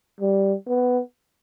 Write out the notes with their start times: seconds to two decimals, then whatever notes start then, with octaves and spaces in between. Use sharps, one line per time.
0.20 G3
0.67 B3